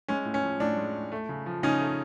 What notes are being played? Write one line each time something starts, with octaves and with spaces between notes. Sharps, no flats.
G#3 C#4
A2
C#4
F3
A2 D4
G#3
A2
A3
C#3
F3
C#3 C#4 D#4
A3